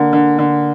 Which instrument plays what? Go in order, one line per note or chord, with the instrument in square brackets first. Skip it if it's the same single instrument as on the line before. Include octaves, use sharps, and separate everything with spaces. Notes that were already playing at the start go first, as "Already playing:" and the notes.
Already playing: [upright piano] D3 A#3
D3
D3